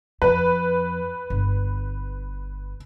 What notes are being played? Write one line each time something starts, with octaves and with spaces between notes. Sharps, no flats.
F2 B4
G1